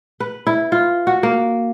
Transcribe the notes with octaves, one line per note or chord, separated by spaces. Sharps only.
B4
E4
F4
F#4
A#3